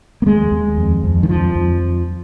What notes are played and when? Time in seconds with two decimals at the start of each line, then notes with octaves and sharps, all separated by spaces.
0.22 A#3
0.26 D#2 G#3
0.51 D#2
0.78 F2
1.04 F2
1.23 D#3
1.29 F2 F3
1.55 F2